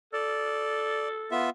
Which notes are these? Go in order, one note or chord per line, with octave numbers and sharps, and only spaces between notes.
A4 D5
B3 F4 E5